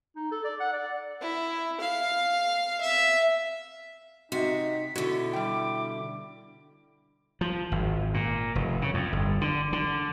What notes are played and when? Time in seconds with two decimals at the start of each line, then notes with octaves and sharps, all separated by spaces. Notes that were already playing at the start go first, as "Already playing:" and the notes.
0.16 D#4
0.31 A4
0.44 D5
0.60 F#5
0.73 D5
1.21 E4
1.81 F5
2.81 E5
4.32 C3 D#4 F#4 B6
4.95 B2 D3 E4 F#4
5.33 G3 G5 D6
7.41 F3
7.72 G#1
8.14 A#2
8.55 F1
8.82 C#3
8.94 F2
9.12 G1
9.41 D3
9.73 D3